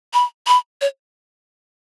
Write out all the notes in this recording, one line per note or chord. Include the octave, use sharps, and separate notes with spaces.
B5
B5
C#5